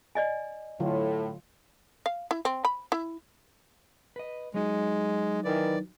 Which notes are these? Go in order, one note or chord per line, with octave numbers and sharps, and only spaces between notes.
D5 D#5 G#5
A2 D3 F#3 F4
F5
E4
C4
B5
E4
B4 D#5
F#3 G#3 D#4 F#4
D#3 E3 D5